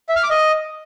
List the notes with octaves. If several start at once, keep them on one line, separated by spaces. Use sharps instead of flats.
E5
F6
D6
D#5